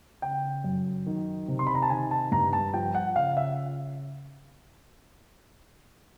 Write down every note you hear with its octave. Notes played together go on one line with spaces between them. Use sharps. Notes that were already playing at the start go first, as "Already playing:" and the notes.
C#3 G5
F#2
D#3
C3
C6
B5
A#5
A5
D#3 G#5
A5
G2 A#5
A5
F3 G5
F#5
C#3 F5
E5